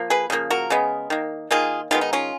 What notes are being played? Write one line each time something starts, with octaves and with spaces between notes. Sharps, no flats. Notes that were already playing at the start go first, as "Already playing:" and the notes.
Already playing: F3 A#3
G#4 B4
C#3 F3 A#3
F#4 A#4
C#3 G#3 B3
D#3 A#3
D#3 A#3 F4 G#4
D#3 G#3 B3 F4
D#4
C#4 F4